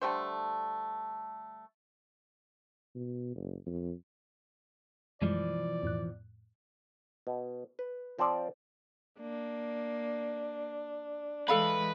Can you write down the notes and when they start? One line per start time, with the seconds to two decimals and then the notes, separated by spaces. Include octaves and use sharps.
0.02 D3 G3 A3 C5
2.95 B2
3.36 F#1
3.66 F2
5.22 F#2 B2 E3 F3 G3 G#3 D5
5.83 F2 A2 F#6
7.27 B2
7.79 B4
8.19 F3 C4 F4 C5 D5
9.20 A#3 D4
11.48 E3 G#3 A4 B4 F5 B5